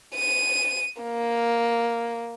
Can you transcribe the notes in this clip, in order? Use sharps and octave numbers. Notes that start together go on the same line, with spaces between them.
D#7
A#3